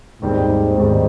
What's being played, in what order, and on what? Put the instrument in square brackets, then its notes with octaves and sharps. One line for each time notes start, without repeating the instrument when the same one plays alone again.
[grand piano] D#2 D#3 G3 C4 [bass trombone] G#2
[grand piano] D#2 D#3 G3 C4 [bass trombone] G#2